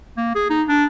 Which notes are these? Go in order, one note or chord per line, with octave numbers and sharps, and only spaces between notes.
A#3
G#4
D#4
D4